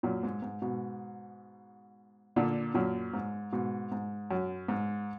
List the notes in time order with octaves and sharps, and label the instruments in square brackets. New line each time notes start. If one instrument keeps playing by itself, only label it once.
[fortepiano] F#2 A#2
G#2
G#2
G#2 B2
A#2 D3
F#2 A#2
G#2
G#2 B2
G#2
F#2
G#2